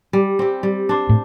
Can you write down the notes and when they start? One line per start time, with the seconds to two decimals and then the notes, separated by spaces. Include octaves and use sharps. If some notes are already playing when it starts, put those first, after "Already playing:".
0.13 G3
0.39 C4 G4
0.63 G3
0.89 D4 C5
1.09 A2